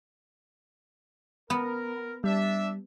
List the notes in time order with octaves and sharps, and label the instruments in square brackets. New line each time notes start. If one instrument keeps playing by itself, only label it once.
[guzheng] B3 [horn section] A#4
[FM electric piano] G3 [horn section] D4 E5